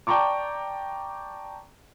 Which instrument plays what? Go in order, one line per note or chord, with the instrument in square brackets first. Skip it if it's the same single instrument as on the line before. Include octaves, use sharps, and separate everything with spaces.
[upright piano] D5 G5 A5 A#5 C#6 D6